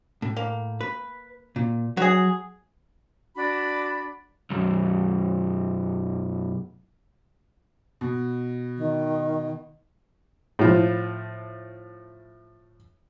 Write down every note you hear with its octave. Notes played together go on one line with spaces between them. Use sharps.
A2
A#3
B4
A#2
F#3 F#4 G#4
D4 F#4 D5 B5
B1 F#2
B2
D#3
A2 F3